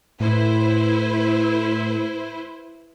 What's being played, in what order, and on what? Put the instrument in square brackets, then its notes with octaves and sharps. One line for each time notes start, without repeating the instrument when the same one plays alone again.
[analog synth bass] A2 [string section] E4 B4 C5